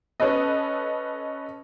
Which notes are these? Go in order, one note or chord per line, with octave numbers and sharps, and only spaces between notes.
C#4 A4 B4 D#5